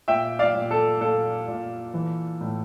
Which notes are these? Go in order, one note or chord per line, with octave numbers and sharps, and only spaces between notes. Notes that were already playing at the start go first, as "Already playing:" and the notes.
A#2 E5 G5
D5 F5
A#2
A4
A#2 A4
A#2
E3
A2